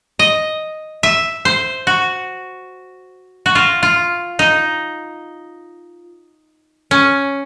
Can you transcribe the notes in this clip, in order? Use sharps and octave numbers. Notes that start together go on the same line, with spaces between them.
D#5
E5
C5
F#4
F#4
F4
F4
D#4
C#4